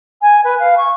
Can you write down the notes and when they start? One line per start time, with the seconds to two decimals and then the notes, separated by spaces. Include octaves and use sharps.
0.22 G#5
0.44 B4
0.59 F5
0.78 C#6